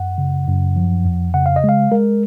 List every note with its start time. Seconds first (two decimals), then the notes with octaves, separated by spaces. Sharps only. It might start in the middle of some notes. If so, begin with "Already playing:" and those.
Already playing: F#2 F#5
0.18 C#3
0.47 F#2
0.76 F3
1.05 F2
1.34 C#3 F#5
1.46 F5
1.56 D#5
1.64 G#3 F5
1.92 G#3 A#4